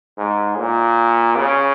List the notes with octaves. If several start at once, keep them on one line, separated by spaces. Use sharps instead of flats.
G#2
A#2
C#3